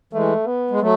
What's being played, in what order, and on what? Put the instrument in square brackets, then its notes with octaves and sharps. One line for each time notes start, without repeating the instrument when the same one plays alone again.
[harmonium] E3 G#3 [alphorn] A3
[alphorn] B3
[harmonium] G#3
F#3 A3